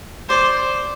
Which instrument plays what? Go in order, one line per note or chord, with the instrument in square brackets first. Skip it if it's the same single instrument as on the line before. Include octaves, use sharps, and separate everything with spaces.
[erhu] C5 [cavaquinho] D5